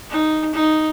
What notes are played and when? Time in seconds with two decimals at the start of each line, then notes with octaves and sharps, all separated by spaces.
0.10 D#4
0.54 D#4